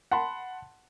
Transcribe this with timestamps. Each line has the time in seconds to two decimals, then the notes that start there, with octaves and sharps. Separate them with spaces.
0.11 F#5 A5 B5 C6